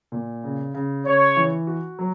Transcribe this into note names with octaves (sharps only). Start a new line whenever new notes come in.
A#2
C#3
C#3
C#3 C#5
E3
F#4
F#3